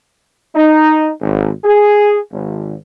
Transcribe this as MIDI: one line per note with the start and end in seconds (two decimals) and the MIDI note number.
0.55 1.10 63
1.21 1.52 32
1.64 2.18 68
2.32 2.75 32